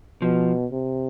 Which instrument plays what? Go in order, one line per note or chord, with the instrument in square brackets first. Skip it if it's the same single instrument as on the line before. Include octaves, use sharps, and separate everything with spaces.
[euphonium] B2 [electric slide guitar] F3
[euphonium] C3